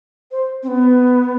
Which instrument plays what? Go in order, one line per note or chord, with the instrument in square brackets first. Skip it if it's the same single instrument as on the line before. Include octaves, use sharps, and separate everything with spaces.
[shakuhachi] C5
C4
B3